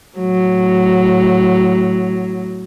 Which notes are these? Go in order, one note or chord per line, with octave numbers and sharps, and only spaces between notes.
A2 F#3